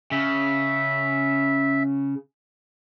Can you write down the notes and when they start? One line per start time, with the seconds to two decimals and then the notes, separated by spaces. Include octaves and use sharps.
0.11 C#3 E5